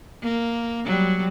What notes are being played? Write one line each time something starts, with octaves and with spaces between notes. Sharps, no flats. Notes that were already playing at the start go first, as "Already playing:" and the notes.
A#3
F#3 G3